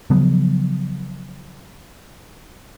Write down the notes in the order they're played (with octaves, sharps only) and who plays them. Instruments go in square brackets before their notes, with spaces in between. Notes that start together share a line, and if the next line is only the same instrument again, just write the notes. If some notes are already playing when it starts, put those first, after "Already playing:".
[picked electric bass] C#3 F3 F#3 B3